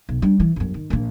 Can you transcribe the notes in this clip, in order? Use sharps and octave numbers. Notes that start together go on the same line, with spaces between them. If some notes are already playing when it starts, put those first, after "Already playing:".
B1
G3 D4
E3
G1 F#2
D#3
A#1 A#3